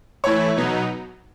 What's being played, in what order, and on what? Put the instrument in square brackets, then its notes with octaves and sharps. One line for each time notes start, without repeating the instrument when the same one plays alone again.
[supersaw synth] E3 A3 E4 [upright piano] C#5
[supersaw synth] B2 F#3 B3 D#4